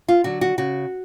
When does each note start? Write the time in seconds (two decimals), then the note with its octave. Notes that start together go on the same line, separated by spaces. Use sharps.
0.08 F4
0.24 D3 F#3 F#4
0.41 F#4
0.58 C#3 F#4